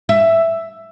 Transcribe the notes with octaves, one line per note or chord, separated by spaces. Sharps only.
E5